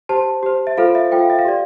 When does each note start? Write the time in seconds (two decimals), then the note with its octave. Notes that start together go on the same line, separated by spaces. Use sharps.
0.09 G4 C5 A5
0.43 G4 C5
0.67 E5
0.78 F4 A4 C5 F5
0.95 E5
1.12 F4 A4 C5 G5
1.20 F5
1.30 E5
1.39 F5
1.45 G4 D5